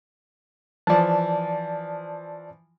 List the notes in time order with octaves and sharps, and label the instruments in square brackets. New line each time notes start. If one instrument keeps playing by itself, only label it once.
[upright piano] E3 F3 [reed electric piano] D5 A5